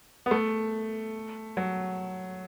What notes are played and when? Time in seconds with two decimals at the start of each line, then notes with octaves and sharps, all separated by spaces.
0.26 B3
0.31 A3
1.57 F#3